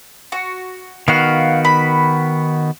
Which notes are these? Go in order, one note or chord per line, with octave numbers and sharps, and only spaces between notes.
F#4
D#3 B3 F#4 F5
B5